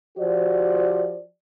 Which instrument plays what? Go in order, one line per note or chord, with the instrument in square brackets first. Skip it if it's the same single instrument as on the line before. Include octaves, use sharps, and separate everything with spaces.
[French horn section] F3 F#4 G4 C5 D5